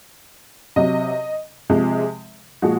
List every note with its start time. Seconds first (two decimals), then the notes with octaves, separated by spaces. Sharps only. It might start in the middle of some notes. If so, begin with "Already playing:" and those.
0.76 C3 F#3 D#5
1.70 C3 F3 G#3
2.62 A#2 F3 G#3 F#4